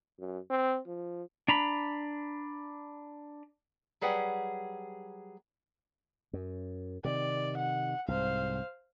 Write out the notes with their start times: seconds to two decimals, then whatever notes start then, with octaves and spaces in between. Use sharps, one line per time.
0.19 F#2
0.50 C4
0.87 F3
1.48 D4 A#5 B5
4.01 F#3 G3 G#4 B4 F#5 G5
6.33 F#2
7.04 C3 D#3 D5
7.57 F#5
8.08 C2 G#2 C5 F5